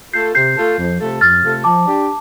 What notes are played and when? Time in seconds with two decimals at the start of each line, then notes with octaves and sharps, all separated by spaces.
0.13 A3 F4 A4 G6 C7
0.35 C3 G6 C7
0.57 A3 F4 A4
0.78 F2
1.00 C3 A3 F4 A4
1.21 F2 F6 A6
1.43 C3 A3 F4 A4
1.64 F3 A5 D6
1.86 D4 G4